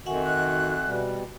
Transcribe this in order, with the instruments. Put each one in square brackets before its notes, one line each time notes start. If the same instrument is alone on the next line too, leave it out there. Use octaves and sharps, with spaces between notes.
[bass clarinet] F2 [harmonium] D#3 F#4 [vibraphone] E5 F#5 G#5
[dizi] F#6
[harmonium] B2 G3